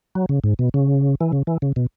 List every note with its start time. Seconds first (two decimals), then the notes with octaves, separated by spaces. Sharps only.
0.15 F#3
0.29 C#3
0.44 G#2
0.59 B2
0.74 C#3
1.21 E3
1.32 C#3
1.47 E3
1.62 C#3
1.76 B2